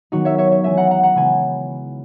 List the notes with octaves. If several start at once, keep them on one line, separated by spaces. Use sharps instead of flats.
D#3 F#3 B3 D#4 F#4
C#5 E5
C#5 E5
C#5 E5
E3 G#3 C#4 E5 G#5
F#5 A#5
F#5 A#5
F#5 A#5
C#3 E3 G#3 B3 G#5 B5